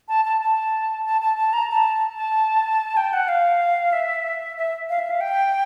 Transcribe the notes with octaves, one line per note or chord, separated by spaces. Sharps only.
A5
A5
A5
A5
A5
A5
A#5
A5
A5
G5
F#5
F5
E5
E5
F5
E5
F5
G5